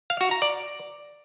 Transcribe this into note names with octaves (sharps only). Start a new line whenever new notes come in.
F5
F#4
A#5
D5